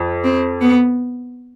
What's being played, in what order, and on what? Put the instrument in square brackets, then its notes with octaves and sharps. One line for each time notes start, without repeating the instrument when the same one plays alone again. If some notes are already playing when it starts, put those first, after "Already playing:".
Already playing: [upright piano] F2
[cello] C4
B3